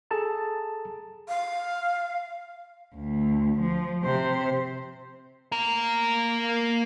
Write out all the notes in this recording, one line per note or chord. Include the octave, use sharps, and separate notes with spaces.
G#4 A4 A5 A#5
F5
D2
F3
C3 C5
A#3 A#4